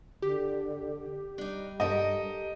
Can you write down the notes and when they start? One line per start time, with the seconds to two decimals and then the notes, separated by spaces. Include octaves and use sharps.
0.22 D3 G4
1.38 G3 D4 D#4
1.80 G2 G4 A4 A#4 D#5